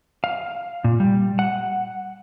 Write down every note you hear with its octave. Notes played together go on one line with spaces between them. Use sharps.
F5
A#2
G3
F#5